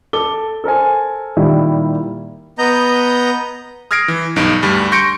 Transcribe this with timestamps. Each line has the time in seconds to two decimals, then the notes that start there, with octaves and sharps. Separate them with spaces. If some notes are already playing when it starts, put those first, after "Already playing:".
0.13 A4 D6 G7
0.64 A4 A#4 C5 G#5
1.37 A#2 D#3 G3 A#3 E4
2.58 B3 D#5 A#5 G6
3.91 D#6 F6 G#6 A#6 C7 D7
4.08 E3
4.36 B1 G2 D#4 D7
4.62 D2 G2 G3
4.92 C6 C#6 G6 A#6 C#7 D7